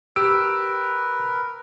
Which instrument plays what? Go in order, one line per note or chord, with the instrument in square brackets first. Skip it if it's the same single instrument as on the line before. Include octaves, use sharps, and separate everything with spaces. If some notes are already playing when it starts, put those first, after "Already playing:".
[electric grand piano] G4 D7 [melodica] A#4 B4 [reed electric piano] E6